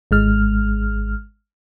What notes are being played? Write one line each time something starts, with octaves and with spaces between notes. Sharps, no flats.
G#1 G#3 F6